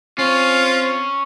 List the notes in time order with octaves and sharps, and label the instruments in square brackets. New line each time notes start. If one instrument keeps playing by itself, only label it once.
[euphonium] C4 [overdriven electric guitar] C#4 [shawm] F4